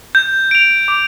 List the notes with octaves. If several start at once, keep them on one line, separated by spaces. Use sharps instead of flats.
G6
D7 F7
D6